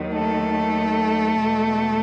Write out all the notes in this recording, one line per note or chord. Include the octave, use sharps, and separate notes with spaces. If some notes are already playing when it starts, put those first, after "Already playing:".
Already playing: D#2 D#3 F#3
A3 A4
E2 B2 G#3